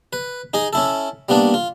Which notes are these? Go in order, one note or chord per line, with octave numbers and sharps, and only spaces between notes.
B4
D#4 G#4 D#5
C#4 E4 A4
G3 A#3 B3 D4
F4